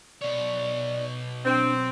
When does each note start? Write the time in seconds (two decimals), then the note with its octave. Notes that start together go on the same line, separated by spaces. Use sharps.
0.21 B2 C#5 D5
1.45 C4 D4